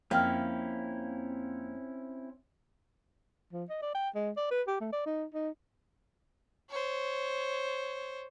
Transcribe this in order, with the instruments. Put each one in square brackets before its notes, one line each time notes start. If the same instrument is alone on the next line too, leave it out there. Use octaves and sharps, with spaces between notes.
[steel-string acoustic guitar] F2 A#3 [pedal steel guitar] C4 C#4 E4 [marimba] F5 G5 F6
[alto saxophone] F3
D#5
D5
G5
G#3
D5
B4
G4
A3
D5
D#4
D#4
[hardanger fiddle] C5 C#5